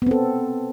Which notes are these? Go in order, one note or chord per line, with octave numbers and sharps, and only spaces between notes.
B3 C4 A4